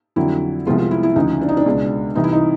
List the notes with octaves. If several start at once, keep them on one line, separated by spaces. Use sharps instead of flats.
F2 D3 F#3 E4
C2 C3 F3 G#3 B3 F4
F4
E4
E4
D2 C#3 F3 D#4
D4
D#4
D4
C#2 B2 G#3
C2 C3 E3 D#4
E4
D#4